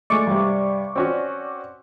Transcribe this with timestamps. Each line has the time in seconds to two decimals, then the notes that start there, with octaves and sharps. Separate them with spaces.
0.10 G#3 A3 D5 C#6 D6
0.27 G2 C3
0.96 C4 C#4 F#4